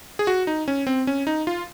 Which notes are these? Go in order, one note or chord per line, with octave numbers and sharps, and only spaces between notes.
G#4
F#4
D#4
C#4
C4
C#4
D#4
F4